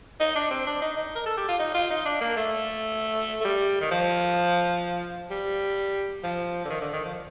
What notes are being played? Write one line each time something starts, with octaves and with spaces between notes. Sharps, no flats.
D#4
D4
C4
D4
D#4
D#4
A#4
A4
G4
F4
D#4
F4
D#4
D4
A#3
A3
A3
G3
D#3
F3
G3
F3
D3
D#3
D3
D#3
F3